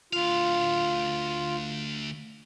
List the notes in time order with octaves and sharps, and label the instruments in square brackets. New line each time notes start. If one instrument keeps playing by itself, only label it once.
[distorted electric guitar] D2 F5 [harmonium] F4